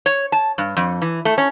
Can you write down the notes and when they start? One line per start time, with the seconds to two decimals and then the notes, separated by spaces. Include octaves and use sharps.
0.06 C#5
0.32 A5
0.58 G2
0.77 F2
1.02 E3
1.25 A3
1.38 C#4